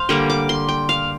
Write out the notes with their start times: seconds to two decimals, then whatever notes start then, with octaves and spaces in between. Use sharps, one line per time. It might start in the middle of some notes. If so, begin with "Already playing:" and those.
Already playing: C5 F5
0.09 D3 G3 A#3 G5
0.30 D6
0.49 C6
0.69 G5
0.89 F5